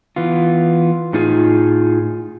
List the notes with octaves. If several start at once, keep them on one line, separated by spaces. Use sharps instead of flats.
E3 B3 F4
A2 D#4 F4 G#4